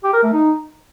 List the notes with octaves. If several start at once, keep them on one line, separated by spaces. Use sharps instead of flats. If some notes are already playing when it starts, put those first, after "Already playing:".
G4
A#4
A3
D#4